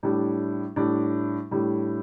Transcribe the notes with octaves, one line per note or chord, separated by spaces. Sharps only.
A2 G3 D4
A2 G3 D4
A2 G3 D4